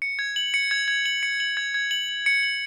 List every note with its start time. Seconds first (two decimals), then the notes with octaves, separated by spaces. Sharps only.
0.02 C#7
0.19 G#6
0.36 F#7
0.54 C#7
0.71 G#6
0.88 G#6
1.06 F#7
1.23 C#7
1.40 F#7
1.57 G#6
1.74 G#6
1.91 F#7
2.09 F#7
2.26 C#7
2.43 F#7